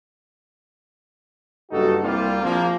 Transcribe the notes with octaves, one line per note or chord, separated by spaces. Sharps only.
F#1 G2 D#4 F#4 A4
C2 G3 A#3 F4
A#1 F3 A#3